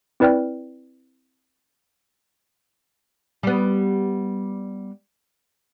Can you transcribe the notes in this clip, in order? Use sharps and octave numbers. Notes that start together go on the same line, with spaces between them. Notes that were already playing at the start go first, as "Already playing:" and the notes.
C4 E4 B4 D5 G5 F6
G3 B3